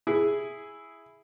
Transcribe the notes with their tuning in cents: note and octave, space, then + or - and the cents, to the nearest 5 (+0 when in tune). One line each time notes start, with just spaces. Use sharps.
E4 +0 G#4 +0